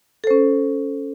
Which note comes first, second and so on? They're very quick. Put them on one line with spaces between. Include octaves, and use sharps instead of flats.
A4 C5 C#4